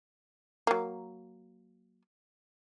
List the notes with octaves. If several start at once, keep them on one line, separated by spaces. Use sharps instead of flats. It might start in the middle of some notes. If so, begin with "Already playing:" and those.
F#3 A#3